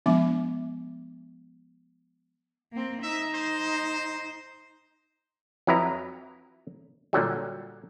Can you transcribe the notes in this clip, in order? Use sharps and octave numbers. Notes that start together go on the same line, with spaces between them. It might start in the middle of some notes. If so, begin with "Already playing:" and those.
F3 G#3 B3 D4 E5 D6
A#3 C4
D#4 E5
C5
F2 F#3 E4 B4 A#5
A#2 D3 F#3 G3